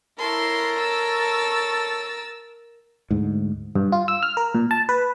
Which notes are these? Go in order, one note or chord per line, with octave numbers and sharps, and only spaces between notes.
E4 A4 A#4 C#5 A5 C6
E6 A6
D2 G#2
G2
F4
E6
F6
A#4
A#2
A5
B4